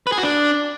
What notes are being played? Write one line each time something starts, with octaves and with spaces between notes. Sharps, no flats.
B4
G#4
F#4
D4